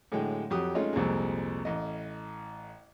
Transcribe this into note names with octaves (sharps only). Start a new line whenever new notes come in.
A2 D3 F#3 G#3 G5
F2 F#3 G4 D#6
G#3 A3 C#4 D#4 F4
C2 F2 A#2 G3 G#3
A1 D#5